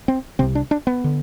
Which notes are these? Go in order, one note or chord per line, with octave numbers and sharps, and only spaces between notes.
C4
C2 C3 C4
D4
D4
B3
D3